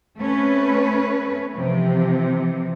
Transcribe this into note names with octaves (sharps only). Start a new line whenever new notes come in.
A3 C4 C#4 B4
C3 E3 F3